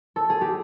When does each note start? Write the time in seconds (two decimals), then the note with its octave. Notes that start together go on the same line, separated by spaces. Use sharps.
0.16 A4
0.30 G#4
0.41 G4